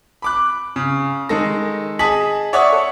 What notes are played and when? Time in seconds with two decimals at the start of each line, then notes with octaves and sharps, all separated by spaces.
0.22 B5 D6 F#6
0.76 C#3
1.29 D#3 G#3 A4 A#6
1.99 G#4 D#5 A5 B6 F#7
2.53 C#5 D5 E5 F#5 C#6 D#6
2.73 A4